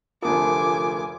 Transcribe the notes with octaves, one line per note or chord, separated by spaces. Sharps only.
F1 D2 F4 A#4 G#5 A5 D6 D#6